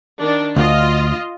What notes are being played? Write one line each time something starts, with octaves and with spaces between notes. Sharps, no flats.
D#3 D4
D2 F4 D#5